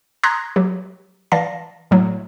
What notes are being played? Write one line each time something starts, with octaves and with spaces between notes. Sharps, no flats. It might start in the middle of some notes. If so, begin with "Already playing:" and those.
A#5 C6 D#6 F#6 G#6 A#6
F#3 G4
E3 D5 F5 A5 A#6
A2 F#3 A3